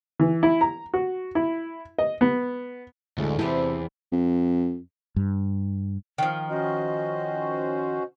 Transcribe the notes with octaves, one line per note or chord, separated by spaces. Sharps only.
E3
E4
A#5
F#4
E4
D#5
B3
A1 D2 G#3 A4
E2 C3 C4 E4 G4 A5
F2
G2
D#3 F3
C#4 F#4 C5 D#5